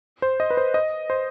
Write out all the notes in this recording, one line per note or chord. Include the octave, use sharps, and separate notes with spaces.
C5
D#5
B4
C5
D#5
C5